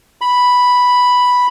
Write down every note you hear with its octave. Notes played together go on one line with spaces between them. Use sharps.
B5